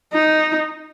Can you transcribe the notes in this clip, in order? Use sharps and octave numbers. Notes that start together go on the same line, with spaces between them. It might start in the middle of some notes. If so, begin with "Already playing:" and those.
D#4